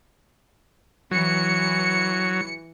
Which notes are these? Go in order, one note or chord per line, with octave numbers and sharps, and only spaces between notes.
E3 F#3 C#7